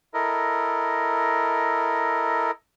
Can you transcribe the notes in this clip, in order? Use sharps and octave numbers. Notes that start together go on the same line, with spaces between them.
E4 A4 A#4 D#5